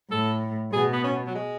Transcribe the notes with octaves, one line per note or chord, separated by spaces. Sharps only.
A2 A4
B2 G#4
B3
C#4
F#3
G#3